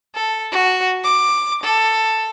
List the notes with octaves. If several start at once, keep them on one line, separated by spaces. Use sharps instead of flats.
A4
F#4
D6
A4